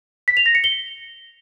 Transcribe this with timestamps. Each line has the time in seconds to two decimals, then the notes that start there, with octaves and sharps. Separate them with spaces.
0.28 B6
0.37 F7
0.46 A#6
0.55 C#7
0.64 G7